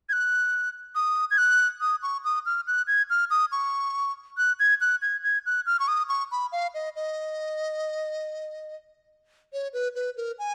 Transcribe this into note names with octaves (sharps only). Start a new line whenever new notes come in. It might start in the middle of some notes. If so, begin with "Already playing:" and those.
G#6
F#6
D#6
G#6
F#6
D#6
C#6
D#6
F6
F#6
G#6
F6
D#6
C#6
F#6
G#6
F#6
G#6
G#6
F#6
F6
C#6
D#6
C#6
B5
F5
D#5
D#5
C#5
B4
B4
A#4
G#5